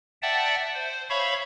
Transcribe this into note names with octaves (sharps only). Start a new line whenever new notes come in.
D5 E5 F#5 G5 A5
C5
C#5 E5 F5 B5 C#6